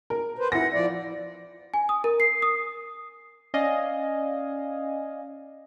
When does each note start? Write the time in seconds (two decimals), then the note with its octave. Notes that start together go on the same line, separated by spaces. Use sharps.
0.10 A#4
0.39 B4 C5
0.52 E4 F#5 A#6
0.74 F3 D5
1.74 G#5
1.89 D#6
2.04 A#4
2.20 C7
2.42 D#6
3.54 C#4 D5 D#5 F5 G#5